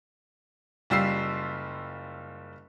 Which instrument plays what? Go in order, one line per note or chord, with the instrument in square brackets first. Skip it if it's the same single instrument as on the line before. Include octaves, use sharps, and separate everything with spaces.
[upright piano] F#1 G3 F4 E6 C7